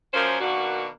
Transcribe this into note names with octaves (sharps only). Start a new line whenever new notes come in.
F#2 F3 A#3 C#4 A#4 C5
B2 D#3 A#3 D4 F#4